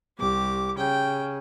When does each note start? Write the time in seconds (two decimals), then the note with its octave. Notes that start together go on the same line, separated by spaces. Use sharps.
0.19 C2 G4 D6
0.78 C#3 G5